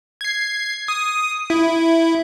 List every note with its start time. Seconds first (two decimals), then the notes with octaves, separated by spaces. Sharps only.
0.21 G#6 C7
0.88 D#6
1.50 E4